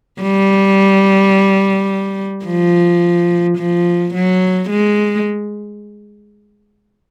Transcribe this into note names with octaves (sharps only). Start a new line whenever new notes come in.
G3
F3
F3
F#3
G#3